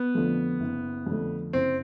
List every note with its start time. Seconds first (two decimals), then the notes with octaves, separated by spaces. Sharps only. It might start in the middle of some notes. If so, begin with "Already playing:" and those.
Already playing: B3
0.14 F2 D3 F3 A3
0.60 F#1
1.06 F2 D3 F3 A3
1.53 F#1 C4